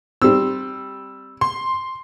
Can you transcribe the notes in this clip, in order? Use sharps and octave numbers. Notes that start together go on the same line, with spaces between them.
G3 C4 E6
C6